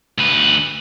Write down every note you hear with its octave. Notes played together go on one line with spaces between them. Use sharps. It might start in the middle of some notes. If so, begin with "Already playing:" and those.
D2 B4